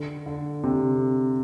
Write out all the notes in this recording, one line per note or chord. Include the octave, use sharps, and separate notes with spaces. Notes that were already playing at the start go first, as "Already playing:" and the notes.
Already playing: D3
D3
C3